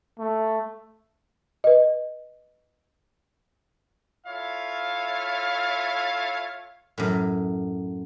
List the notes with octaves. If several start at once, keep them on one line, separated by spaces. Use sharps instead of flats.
A3
B4 D#5
E4 F4 A4 C#5 E5 F5
F#2 A2